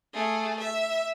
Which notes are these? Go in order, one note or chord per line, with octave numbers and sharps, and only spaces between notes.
A3 G#4
E5